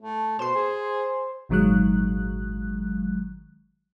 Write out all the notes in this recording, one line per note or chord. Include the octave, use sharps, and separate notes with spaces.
A3
B2 C5 C6
G#4
G#1 A#2 D#3 F#3 G#3 F#6